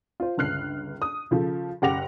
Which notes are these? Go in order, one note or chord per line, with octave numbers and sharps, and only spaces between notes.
F4 C5
G1 C#2 F6 F#6 C7
D#6
C#3 F3 A4
F#1 G4 F#5 D6 A#6 F7